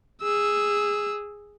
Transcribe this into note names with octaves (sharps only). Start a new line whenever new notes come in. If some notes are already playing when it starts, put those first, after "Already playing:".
G#4 E6